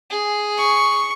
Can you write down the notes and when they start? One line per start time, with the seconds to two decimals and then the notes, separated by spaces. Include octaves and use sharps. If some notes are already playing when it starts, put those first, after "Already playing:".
0.10 G#4
0.58 C#6